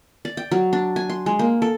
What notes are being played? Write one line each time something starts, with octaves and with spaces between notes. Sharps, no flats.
D5
G5
F#3
D4
G#5
C6
G#3
A#3
A4